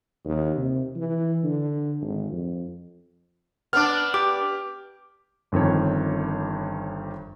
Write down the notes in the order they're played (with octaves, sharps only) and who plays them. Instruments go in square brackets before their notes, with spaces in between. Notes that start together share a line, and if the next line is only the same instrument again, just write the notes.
[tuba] D#2
C3
E3
D3
G#1
F2
[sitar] B3 D4 [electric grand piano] D6 F6
[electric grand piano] G4 [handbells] D6
[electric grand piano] G1 F2 D#3 C#5